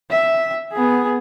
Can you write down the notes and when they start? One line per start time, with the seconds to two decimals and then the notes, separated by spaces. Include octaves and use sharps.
0.11 E5
0.73 B3 G#4